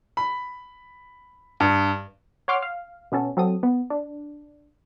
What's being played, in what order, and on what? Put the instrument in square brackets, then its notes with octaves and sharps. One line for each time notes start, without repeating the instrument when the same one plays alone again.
[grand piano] B5
G2
[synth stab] C#5 F#5 C6 D6 F6
F5
B2 B3 C#4 A4
F#3 C4 A4 D#6
B3
D4